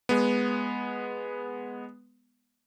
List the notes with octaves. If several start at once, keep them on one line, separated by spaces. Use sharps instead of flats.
G#3 B3